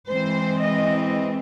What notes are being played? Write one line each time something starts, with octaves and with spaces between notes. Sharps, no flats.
E3 G#3 C4 C5
D#5